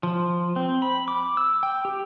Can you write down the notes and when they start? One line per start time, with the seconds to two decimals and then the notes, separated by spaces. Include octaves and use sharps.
0.03 F3
0.56 C4
0.82 B5
1.08 D6
1.37 E6
1.63 G5
1.85 G4